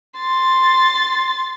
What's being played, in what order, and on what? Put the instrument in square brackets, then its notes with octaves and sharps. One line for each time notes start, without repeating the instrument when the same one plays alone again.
[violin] C6 A6